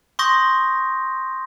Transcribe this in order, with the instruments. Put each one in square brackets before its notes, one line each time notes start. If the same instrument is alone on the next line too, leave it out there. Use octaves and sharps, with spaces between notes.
[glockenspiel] C6 C#6 D#6 G6 A#6